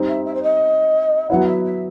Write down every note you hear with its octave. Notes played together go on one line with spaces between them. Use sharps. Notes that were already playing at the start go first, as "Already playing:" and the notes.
Already playing: G3 C4 D#4
E5
E5
C5
D#5
F#3 B3 E4 F#5
E5
E5